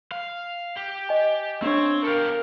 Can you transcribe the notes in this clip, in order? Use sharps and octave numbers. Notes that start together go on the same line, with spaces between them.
F5
G4
D#5 G#5
B3 C4 D4 C#5
G4 A4 A#4 F5